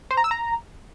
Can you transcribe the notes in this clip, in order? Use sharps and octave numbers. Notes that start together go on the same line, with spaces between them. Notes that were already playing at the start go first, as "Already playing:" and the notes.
C5
A#5
E6
A#5